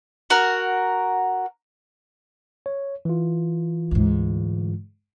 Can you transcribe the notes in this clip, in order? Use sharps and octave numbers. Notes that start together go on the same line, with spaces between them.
F#4 A#4
C#5
E3 F4
D2 G#2